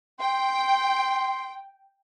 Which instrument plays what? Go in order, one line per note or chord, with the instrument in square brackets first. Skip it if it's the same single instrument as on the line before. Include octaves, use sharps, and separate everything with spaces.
[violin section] G5 [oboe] C6